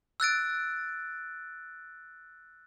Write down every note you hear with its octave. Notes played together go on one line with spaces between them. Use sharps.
E6 F#6 A6 D7